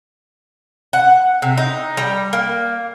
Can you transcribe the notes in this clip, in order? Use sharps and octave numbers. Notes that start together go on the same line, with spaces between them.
F#5
C3
D#4
G3
A#3